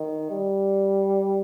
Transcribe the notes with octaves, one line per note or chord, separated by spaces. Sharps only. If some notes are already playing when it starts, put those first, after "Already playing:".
Already playing: D#3
G3